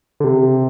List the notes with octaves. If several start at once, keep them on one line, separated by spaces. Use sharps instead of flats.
D3
C3